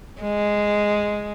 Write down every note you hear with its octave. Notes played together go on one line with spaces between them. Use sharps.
G#3